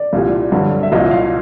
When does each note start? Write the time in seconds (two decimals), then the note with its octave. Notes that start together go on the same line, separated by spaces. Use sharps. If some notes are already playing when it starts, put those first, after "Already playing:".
Already playing: D5
0.13 C2 A#2 G3
0.52 G2 D3 F#3
0.83 E5
0.92 C2 A#2 F#3 D#5
1.11 F5